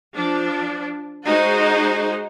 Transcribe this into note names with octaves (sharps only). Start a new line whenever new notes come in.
F3 D4
G#3 D#4 F#4 G#4 C5